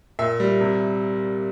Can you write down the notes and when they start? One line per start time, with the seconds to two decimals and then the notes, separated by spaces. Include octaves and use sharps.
0.19 A#2 E5
0.40 G3
0.61 C3